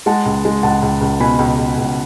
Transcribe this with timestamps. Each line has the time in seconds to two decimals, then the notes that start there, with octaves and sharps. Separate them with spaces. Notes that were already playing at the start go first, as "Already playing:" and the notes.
0.06 G#3 F#5 A5
0.26 C#2
0.45 G#3
0.63 C#2 F#5 A5
0.82 C#2
1.01 C#2
1.20 B2 G#5 B5
1.39 C#2
1.58 C#2
1.77 C#2